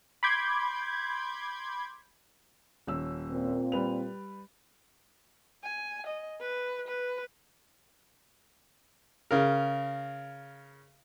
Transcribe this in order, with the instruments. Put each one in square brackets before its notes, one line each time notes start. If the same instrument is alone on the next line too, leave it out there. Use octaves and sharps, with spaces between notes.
[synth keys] B5 C6 D6 G6 G#6
[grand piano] D#1 C#4 E6
[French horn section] A#2 C4
[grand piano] G3 B4 F7
[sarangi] G#5
D#5
B4
B4
[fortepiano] C#3 A#4